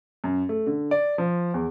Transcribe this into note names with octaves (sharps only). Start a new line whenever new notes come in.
F#2
A3
D3
D5
F3
E2